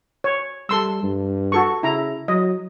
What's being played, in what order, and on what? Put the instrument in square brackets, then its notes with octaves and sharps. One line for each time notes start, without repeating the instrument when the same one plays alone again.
[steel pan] C#5
[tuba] G3 [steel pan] A4 C6 E6
[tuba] G2
[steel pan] F#4 A4 C#6
[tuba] C#3 [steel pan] E4 A#5
[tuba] F#3 [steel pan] D#5